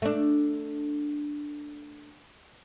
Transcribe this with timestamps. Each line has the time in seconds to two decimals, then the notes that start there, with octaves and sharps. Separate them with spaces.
0.02 A3 D4